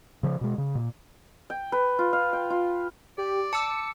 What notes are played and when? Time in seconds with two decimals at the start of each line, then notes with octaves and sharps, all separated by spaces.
0.23 C#3 F3
0.41 B2 G#3
0.58 C#3
0.75 A#2
1.50 G5
1.72 B4
1.99 F4
2.13 F5
2.33 G5
2.50 F4
3.18 G4 D5
3.53 A5 D6 E6 C#7